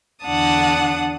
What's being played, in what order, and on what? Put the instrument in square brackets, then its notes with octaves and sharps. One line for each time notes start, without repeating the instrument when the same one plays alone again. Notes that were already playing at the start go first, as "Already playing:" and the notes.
[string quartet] E2 D3 D4 F#5 A5 D#6